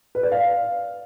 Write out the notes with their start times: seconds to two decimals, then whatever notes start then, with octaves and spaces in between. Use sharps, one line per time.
0.15 B4
0.23 D5
0.32 F5